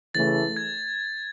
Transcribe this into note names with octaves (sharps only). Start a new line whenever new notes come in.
C#3 E3 A3 A6
G#6